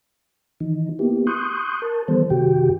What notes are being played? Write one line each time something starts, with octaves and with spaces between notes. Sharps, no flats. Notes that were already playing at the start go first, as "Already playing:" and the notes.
D#3 E3 D#4
A#3 B3 E4 G4
C6 C#6 D#6 F#6 G6
A#4 A5
D#3 E3 G3 B3 A4 C5
F#2 C3 D#3 F#4 G4 G5